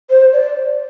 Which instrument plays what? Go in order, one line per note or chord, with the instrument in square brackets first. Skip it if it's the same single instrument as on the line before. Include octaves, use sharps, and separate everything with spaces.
[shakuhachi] C5
D5